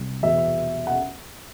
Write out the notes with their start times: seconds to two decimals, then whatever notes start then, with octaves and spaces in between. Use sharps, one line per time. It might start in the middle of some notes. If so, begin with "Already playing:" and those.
Already playing: C2
0.23 E2 B2 E5
0.87 F#5